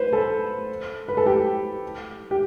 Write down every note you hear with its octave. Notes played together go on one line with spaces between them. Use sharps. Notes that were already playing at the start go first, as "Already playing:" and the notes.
Already playing: B4 C5
A4
B4
A4
G4
G4